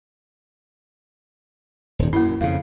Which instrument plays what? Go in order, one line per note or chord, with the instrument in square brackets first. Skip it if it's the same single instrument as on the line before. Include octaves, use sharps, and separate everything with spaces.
[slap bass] D#1 G#2
[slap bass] F#2 [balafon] A#3 E4
[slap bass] F2 C#3 [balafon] F5